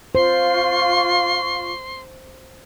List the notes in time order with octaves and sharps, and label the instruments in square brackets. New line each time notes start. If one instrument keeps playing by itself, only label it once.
[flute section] F4 C#6 [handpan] C5 [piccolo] C6